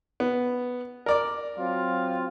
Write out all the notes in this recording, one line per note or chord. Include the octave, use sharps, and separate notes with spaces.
B3
A#4 D5 D6
F#3 C4 F4